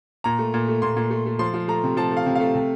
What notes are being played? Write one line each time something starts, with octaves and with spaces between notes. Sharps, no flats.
A#2 A#5
A3
A#2
A3
A#2 C6
A#2
A3
A3
F3 C6
F3
A3 A#5
C3
F3 A5
A3
F5
C3
A3 F5
C3